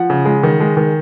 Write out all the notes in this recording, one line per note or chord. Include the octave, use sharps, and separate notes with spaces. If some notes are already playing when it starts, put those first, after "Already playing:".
Already playing: F3 F#5
C#3
G#3
D#3
G#3
D#3